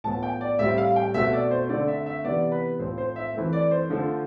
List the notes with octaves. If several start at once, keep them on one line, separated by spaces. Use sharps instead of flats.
A2 F3 B3 A5
G5
D5
A2 G3 C4 E5
F5
G5
B2 A3 C4 E5
D5
C5
D3 A3 C4 D5
E5
E5
C3 E3 B3 D5
B4
A2 F3 C4 C5
C5
E5
E3 A3 C4
D5
C5
D3 F3 A3